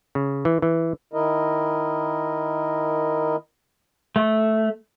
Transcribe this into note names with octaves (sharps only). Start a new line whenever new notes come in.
C#3
E3
E3
D#3 E4 A#4 D#5
A3